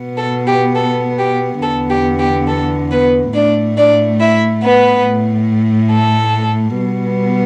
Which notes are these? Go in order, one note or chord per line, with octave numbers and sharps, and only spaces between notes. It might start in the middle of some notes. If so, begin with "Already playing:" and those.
Already playing: B2 B3
A4
G4
A4
G4
E2 D3 B3 A4
G4
G4
A4
B3 B4
A2 A3 D4 D5
D4 D5
E4 E5
B3 B4
A2 A3
A4
B2 G3 B3